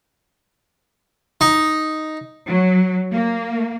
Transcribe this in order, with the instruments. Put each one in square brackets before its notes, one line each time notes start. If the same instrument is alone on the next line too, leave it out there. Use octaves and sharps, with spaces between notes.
[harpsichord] D#4
[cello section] F#3
A#3